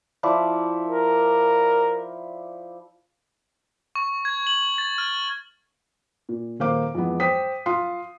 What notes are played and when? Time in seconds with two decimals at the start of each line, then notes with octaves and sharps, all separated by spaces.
0.23 F3 E4 D5
0.88 A#4
3.95 C#6
4.25 G#6
4.47 F#7
4.78 A6
4.98 F6
6.29 A#2
6.60 D#1 A#3 C5 F5 D6
6.95 F2 E3 G#3 B3
7.20 C5 G5 D#6 B6
7.66 F4 F5 C6 D#6 C7